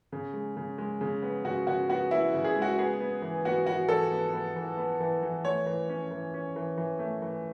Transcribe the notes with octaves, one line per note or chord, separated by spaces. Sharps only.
C#3
G#3
C#3
G#3
C#3
B3
C#3 F#4
C#3 F#4
B3 F#4
B3 E4
C#3
G#4
G#3
F#4
B3 G#4
B3
E3
B3 F#4
B3 F#4
E3 A4
B3
B3
E3
B3
E3
E3
A3 C#5
E3
C#4
E3
C#4
E3
E3
A3
E3